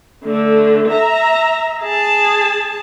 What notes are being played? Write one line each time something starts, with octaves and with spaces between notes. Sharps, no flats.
D3 A3
E5 A#5
G#4 A5